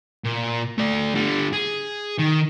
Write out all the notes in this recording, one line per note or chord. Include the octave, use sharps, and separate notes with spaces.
A#2
A3 D5
D3 G3
G#4
D#3